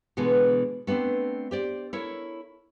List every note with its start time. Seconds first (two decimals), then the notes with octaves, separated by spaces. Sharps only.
0.17 B2 D3 E3 G#3 B3
0.87 A3 B3 C4 D4
1.51 G4 C5 D5
1.93 E4 A4 A#4 C#5